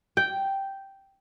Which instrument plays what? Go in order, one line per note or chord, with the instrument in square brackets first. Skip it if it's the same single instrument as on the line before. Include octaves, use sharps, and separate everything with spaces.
[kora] G5